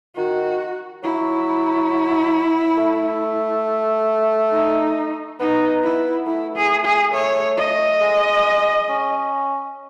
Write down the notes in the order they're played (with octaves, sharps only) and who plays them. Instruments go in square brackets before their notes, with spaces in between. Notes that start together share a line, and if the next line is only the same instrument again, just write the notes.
[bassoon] D#3 [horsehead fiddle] F#4
[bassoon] F#3 [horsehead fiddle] E4
[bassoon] A3
[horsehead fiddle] D#4
[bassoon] B3 [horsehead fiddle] D#4
[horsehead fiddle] E4
[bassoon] A3 [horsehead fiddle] E4
[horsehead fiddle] G#4
G#4
[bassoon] A3 [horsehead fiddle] C#5
[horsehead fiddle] D#5
[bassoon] G#3
C#4